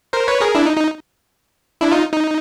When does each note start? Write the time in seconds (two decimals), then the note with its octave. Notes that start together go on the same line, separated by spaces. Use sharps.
0.13 A#4 C5
0.28 B4 C#5
0.41 G#4 A#4
0.55 D4 E4
0.66 D#4
0.77 D#4
1.81 D4 E4
1.91 D#4 F4
2.13 D#4